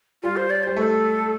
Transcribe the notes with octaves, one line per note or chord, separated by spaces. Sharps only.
G3 F4
C5
D5
G3 C5
A3 C5
A4